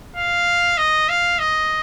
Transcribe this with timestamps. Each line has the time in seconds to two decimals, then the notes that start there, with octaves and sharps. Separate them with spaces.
0.17 F5
0.78 D#5
1.09 F5
1.39 D#5